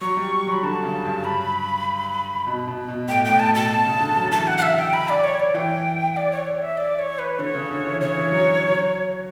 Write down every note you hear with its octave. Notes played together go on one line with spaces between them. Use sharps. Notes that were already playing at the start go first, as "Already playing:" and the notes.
F#3 C#6
G3
F#3 B5
D3 A5
C#3
G2
B5
B2
B2
B2
A2 G5
A2 G5
A5
B2
A5
C#3
D3
F#3
E3 A5
F#5
F#5
E5
G5
B5
D5
C#5
D5
E3 G5
D5
C#5
D5
E5
D5
C#5
B4
D3 C#5
C#3
D3
E3
C#3 C#5
E3
F#3
F#3